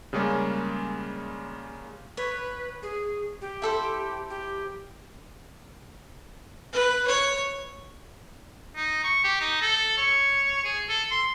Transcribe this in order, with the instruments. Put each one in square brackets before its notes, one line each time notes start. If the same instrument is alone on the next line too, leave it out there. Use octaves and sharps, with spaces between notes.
[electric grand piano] C#3 G3 G#3 A#3 C#4
[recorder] B4 [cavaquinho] C#5
[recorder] G#4
G4
[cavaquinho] E4 A4 C5
[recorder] G4
[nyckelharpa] B4
C#5
[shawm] D#4
C#6
G4
D#4
A4
C#5
G#4
A4
C6